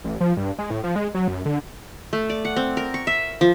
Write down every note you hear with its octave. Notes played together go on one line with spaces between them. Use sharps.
A1
F3
G2
G#3
A2
F3
G#3
F#3
F#2
D3
A3
D5
F#5
C4
A#4
C#6
E5
F3